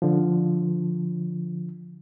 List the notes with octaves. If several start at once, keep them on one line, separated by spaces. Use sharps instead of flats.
D3 F3